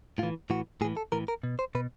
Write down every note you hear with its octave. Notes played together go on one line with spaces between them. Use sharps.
A2 E3 F4
A2 E3 F#4
A2 E3 G#4
A4
A2 E3 A#4
A#4
B2
C5
B2 B4